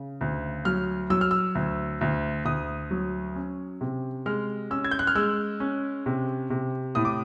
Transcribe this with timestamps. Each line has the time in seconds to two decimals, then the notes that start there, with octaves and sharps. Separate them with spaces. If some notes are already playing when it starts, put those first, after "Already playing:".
Already playing: C#3
0.21 D2
0.65 F#3 F6
1.10 F#3 E6
1.21 F6
1.31 E6
1.55 D2
2.01 D2
2.45 D2 D#6
2.91 F#3
3.36 C#4
3.81 C3
4.26 G#3 F6
4.71 C#4 E6
4.84 G#6
4.91 G6
4.99 F#6
5.07 F6
5.15 G#3 E6
5.60 C#4
6.06 C3
6.50 C3
6.95 A2 D#6
7.05 D6